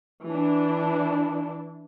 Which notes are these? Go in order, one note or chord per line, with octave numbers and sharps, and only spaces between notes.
E3 D4